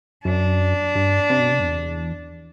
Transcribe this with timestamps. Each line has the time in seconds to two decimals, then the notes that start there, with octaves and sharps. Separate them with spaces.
0.25 F#2 D4
0.95 G2
1.30 C3
1.40 B2
1.51 C3
1.60 F#2
1.64 E2